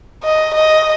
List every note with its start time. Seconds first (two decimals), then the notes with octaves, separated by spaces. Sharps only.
0.23 D#5
0.54 D#5